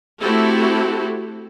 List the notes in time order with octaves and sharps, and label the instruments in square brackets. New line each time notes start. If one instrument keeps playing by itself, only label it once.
[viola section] A3 C4 E4 F#4 G4 A4